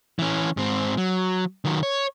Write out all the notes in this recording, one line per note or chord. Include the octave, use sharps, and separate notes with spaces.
E3 C#4
G#2 C4
F#3
D#3 F#3
C#5